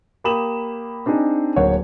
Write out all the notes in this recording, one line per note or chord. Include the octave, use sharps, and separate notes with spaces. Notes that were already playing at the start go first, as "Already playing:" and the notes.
A#3 G4 B5 D#6 E7 F#7
C4 D4 D#4 G#4
D1 A#3 C5 C#5 F#5